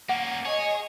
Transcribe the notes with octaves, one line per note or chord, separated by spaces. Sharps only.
A#3 C#4 F#5
G#4 C#5 D#5